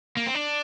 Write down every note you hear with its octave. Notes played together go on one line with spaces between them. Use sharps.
A#3
C4
D4